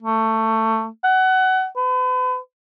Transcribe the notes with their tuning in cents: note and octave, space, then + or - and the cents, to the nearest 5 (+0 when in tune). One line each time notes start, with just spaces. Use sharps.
A3 +20
F#5 +25
B4 +40